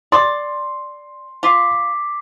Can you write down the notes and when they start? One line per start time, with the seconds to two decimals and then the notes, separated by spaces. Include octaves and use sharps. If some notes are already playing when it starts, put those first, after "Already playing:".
0.12 D5 C6
1.43 F4 D6 B6 C7